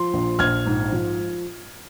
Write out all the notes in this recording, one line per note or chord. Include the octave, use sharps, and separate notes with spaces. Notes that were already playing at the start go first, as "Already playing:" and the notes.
Already playing: F3 C6
A#1
A#1 F6 G#6
G#2
F3